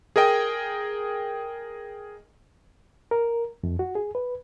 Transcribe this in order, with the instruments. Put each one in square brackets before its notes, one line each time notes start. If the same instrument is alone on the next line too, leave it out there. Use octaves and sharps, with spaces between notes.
[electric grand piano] G#4 A#4 D#5 G5
[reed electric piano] A#4
F2
F#4
G#4
B4